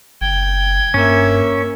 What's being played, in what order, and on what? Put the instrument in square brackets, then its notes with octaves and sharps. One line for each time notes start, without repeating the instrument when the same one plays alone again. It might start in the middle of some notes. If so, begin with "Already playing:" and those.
[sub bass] F#1 [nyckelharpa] G5 [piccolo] G#6
[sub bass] G2 [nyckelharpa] A#3 E5 [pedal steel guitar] C#4